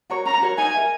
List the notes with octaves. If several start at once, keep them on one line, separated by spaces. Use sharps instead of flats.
F#4 A#4 C#5
C#4 A#5
F#4 A#4 C#5
D#4 G#5
A#4 E5